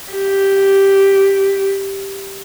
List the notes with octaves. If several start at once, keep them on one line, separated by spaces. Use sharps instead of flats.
G4